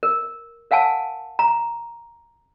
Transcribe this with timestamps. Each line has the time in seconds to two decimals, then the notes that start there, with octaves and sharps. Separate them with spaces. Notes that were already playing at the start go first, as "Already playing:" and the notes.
0.03 A#4
0.71 A#4 F5 F#5 G#5 A5
1.39 A#5